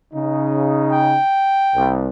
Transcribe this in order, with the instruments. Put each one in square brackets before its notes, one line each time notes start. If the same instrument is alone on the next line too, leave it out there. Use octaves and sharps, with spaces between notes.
[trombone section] C#3 D#4
[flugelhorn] G5
[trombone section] C2